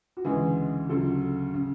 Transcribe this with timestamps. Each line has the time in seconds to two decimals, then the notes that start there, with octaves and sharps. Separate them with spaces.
0.17 F#4
0.25 D2 C#3 E3 G#3 G#4
0.89 D2 C#3 F#3 A4
1.54 C#3